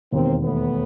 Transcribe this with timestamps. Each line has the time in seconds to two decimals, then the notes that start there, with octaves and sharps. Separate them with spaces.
0.12 E1 D#2 D#3 A#3 C4
0.43 A3 B3